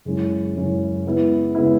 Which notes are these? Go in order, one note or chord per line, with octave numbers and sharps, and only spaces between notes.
F#2 C#3 G#3 C#4 E4
F#2 C#3 G#3 C#4 E4
C#3 G#3 B3 E4
C#3 G#3 B3 E4